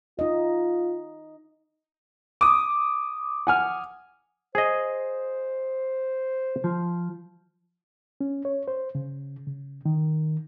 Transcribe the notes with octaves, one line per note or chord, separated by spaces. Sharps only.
D#4 F4 D#5
D6 D#6
F#5 G#5 F6
G#4 C5 D#5
F3
C#4
C#5
C5
C#3
C#3
D#3